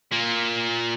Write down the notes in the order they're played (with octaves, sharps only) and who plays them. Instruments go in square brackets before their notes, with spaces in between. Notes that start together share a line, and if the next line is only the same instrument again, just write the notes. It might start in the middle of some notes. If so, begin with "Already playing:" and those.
[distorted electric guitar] A#2 A#3